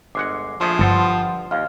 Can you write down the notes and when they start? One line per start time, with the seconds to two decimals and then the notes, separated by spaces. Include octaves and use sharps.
0.15 G1 G#3 F#5 D6 C7
0.61 A#1 F3 A3 G#4 D#6
0.79 G1 G2 A4 C5 F#5 C6 D#6
1.51 D#2 F5 F6